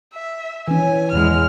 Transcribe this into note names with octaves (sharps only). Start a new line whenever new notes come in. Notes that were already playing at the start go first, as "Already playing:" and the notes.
E5
E3 C#4 G#5
E2 G#3 F6